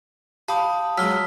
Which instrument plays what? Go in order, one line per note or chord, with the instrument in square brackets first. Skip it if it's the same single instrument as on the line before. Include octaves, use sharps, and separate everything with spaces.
[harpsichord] G4 [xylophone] F5 B5 [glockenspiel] A5 D#6
[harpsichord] F#3 G#3 [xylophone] E6 F6 [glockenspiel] B6 G7